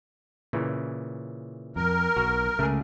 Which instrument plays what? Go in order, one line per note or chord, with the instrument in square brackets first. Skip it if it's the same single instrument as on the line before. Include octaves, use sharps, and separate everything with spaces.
[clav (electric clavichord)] A#2 C#3 E3
[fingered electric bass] F2 [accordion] A#4
[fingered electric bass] B1 [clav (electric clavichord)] F#4 A#5
[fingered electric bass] C#2 C#3 [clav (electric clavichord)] A3 G#4